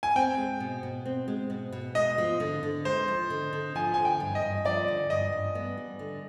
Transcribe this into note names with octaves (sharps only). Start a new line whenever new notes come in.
G#5
C4 G5
G#3
B2
B2
C4
G#3
B2
B2
G#3 D#5
F3
D3
D3
G#3 C5
F3
D3
D3
F3 G#5
G#5
D3
G5
G2
D#5
G2
F3 D5
D3
G2 D#5
G2
B3
G3
D3